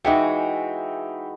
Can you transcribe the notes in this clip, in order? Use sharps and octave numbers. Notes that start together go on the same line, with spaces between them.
E3 G#3 D#4 F#4 E5 G5